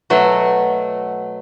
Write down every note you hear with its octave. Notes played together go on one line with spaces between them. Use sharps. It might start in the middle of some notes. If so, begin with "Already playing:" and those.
B2 F#3 A3